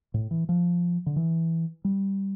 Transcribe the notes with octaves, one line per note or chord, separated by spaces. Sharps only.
A2
E3
F3
D3
E3
G3